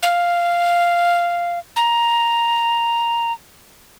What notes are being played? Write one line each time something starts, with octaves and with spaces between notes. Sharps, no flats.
F5
A#5